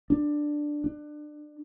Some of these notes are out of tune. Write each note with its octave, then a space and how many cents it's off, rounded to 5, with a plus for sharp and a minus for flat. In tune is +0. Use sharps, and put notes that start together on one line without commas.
D4 +5
D4 +25